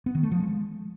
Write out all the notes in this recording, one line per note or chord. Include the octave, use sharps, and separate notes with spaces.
B3
D#3
A3
F3
G#3